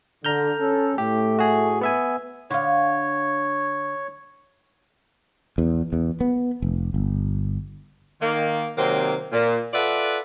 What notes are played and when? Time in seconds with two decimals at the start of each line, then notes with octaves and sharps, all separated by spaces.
0.25 D3 A#5 F6 G6
0.59 C#4 A4
0.98 A2 A3 G4
1.39 F#4 G#4
1.81 B3 E5 G#5
2.50 D3 C#5 F5
5.58 E2
5.93 E2
6.21 B3
6.62 F1
6.94 G1
8.22 D#3 A#3
8.78 C3 D#3 F#3 A#3 C4
9.32 A#2
9.74 F4 A4 B4 D5 E5 F#5